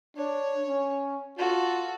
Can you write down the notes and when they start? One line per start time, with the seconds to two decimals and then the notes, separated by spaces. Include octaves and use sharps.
0.17 D4 C#5
0.68 C#4
1.38 F4 F#4 A4